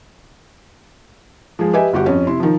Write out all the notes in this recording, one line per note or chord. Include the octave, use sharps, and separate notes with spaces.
F3 G#3 G#4
G4 B4 D#5 E5 G#5
G1 F#4 G4 F#5
F2 C#4
C3 E4 C6
D#3 F3